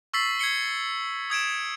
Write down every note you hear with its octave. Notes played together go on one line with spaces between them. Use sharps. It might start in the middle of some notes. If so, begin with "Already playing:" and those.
C#6 E6 A6 B6 C7 F#7
G#6 C7 C#7 G7
D#6 G#6 D7 E7